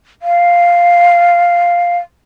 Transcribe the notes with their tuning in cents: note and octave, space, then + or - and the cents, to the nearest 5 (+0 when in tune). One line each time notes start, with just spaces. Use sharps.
F5 +0